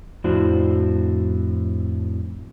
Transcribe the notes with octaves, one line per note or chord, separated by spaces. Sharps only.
F2 A2 D4 E4 F#4 C5